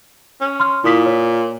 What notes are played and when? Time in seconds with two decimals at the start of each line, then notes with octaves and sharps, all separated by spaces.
0.41 C#4
0.60 C6 F6
0.84 A#2 E4 D#6 B6
1.06 C#5